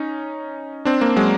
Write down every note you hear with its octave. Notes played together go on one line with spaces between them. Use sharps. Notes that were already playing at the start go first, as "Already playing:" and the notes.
Already playing: C#4 D#4
C4 D4
A#3 C4
F#3 G#3